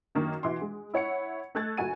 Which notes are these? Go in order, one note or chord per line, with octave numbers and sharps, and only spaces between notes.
F#2 D#3 A#3
B2 E3 C6
G#3
E4 C#5 F#5 C#7
A3 A4 F#6 G#6 A6
F#1 F#4 G#5 D#7